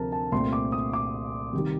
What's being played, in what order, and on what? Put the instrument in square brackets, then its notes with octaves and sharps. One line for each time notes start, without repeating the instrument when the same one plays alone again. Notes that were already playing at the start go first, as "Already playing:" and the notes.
Already playing: [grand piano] D2 C3 F3 C4 A#4 A5
A5
C2 A#2 A3 C4 C6
D6
D#6
D6
C3 D#3 G3